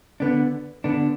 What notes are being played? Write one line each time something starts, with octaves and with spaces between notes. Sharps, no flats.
D3 B3 D4
D3 B3 D4